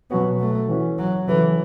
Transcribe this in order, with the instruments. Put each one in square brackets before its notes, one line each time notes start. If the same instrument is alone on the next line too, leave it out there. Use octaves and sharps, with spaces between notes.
[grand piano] B2 F#3 C#4 F#4 C#5 [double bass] B3
[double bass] A3
[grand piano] E3 C#4 F#4
[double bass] F#3
[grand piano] C#3 F#3 C#4 A4 [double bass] E3